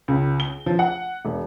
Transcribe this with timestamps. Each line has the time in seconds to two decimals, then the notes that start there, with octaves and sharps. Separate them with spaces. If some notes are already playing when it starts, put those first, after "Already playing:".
0.08 C#2
0.40 G7
0.66 F3
0.79 F#5
1.25 E1